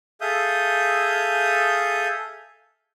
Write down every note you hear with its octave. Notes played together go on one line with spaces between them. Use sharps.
G#4 A4 E5 F5 D#6 G6